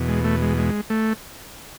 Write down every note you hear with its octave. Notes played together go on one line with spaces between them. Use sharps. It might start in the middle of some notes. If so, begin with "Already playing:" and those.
Already playing: E2 B2
G#3
A3
G#3
G#3
A3